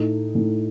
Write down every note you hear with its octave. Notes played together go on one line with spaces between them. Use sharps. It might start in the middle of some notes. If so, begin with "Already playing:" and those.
Already playing: A2 A3 D#4
A2 A3 D#4